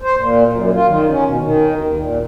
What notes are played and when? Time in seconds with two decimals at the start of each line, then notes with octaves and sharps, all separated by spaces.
0.01 C5
0.17 A#2
0.53 F#2
0.74 F4
0.87 D#3
1.09 C#4
1.26 B2
1.41 D#3
1.80 D#2
1.99 A#2